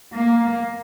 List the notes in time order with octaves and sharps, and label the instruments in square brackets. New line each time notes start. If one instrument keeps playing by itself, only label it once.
[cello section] A#3